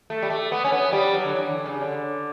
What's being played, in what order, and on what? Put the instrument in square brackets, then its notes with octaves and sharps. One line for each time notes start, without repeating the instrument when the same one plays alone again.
[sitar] A3
G3
A3
B3
C#4
B3
G3
F#3
D3
E3
E3
D3
C#3
D3